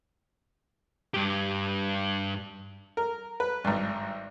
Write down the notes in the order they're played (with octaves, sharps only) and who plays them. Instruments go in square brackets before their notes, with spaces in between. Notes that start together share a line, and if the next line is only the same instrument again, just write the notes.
[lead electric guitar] G2 G4
[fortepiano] A#4
B4
G#1 G2